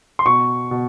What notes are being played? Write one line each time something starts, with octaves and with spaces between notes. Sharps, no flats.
C6
B2 C#6
B2